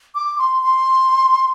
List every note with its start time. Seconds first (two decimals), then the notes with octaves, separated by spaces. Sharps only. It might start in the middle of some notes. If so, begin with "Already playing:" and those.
0.15 D6
0.39 C6
0.63 C6